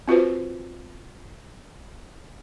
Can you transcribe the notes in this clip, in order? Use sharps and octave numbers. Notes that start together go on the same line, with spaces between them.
C4 F4 F#4 B4 C5